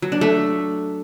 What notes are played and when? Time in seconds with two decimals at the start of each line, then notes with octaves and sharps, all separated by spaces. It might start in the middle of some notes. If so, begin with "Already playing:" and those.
0.02 F#3
0.12 D4
0.21 A3